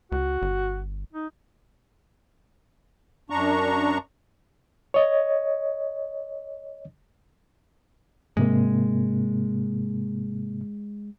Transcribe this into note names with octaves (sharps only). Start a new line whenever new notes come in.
C#2 F#4
G1
D#4
F#2 D4 A#5 C#6
C#5 D#5
G#2 C3 G#3 A#3